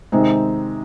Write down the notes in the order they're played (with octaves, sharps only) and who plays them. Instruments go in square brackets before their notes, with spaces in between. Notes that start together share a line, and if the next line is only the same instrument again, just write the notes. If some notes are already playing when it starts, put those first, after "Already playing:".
[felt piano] C3 D#3 G#3 C4 D#4